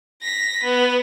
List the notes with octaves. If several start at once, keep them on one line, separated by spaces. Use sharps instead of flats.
A#6 B6
B3